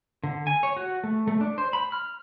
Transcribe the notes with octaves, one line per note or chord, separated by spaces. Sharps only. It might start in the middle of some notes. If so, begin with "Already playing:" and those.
D3
G#5
C#5
F#4
A3
A3
D4
C5
B5
F6